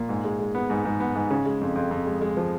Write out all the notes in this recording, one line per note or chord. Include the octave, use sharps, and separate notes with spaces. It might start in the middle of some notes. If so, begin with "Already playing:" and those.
Already playing: A#2
G#2
G#3
G#3
B3
G#2
G#2
B3
G#2
C#3
G#3
F2
F2
F2
G#3
G#3
F3